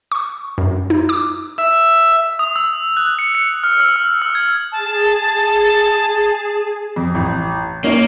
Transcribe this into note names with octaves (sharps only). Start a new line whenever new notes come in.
C#6
F#2
D#4
D6
E5
D#6
E6
F#6
C#7
C#7
F6
E6
F6
E6
G#6
G#4 A5
F2
A1
A#3 C#4 D#4 C#5